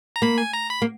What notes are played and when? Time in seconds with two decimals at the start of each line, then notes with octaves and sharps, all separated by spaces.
0.16 A#5
0.22 A#3 B5
0.38 G#5
0.54 A#5
0.70 B5
0.82 A#3